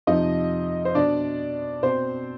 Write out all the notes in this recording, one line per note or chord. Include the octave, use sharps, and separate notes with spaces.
F2 C3 F3 D#4 D#5
C5
B2 D4 D5
B2 C4 C5